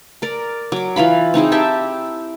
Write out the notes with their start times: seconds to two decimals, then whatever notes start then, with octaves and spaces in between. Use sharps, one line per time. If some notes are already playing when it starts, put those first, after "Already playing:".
0.22 A#4 D5
0.72 F#3 D6
0.96 E3 F4 F5 B5
1.34 C4 D#4 E4 G#4
1.52 G4 E5 G5 A5